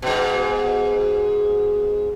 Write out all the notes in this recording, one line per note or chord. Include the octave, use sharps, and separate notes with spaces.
G#2 B2